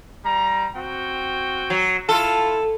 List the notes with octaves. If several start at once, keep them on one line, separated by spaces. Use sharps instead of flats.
G3 A#5
C4 F#4 G5
F#3
E4 F4 A4